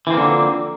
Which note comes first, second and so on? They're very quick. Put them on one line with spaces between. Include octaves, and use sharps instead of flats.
E3 C4 A#3 D3 F3